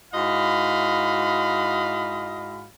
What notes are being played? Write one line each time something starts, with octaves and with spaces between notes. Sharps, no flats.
G#2 E4 F#4 D#5 F5 B5